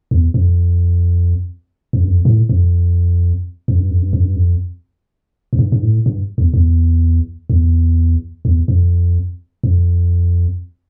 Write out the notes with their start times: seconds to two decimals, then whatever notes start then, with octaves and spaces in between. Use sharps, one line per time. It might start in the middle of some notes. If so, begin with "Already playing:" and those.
0.11 E2
0.34 F2
1.93 F2
2.04 G2
2.09 F2
2.25 A2
2.49 F2
3.68 F2
3.80 G2
3.91 F2
4.02 G2
4.13 F2
4.25 G2
4.36 F2
5.53 F2
5.59 G2
5.72 G2
5.82 A2
6.06 G2
6.38 E2
6.54 E2
7.50 E2
8.45 E2
8.68 F2
9.64 F2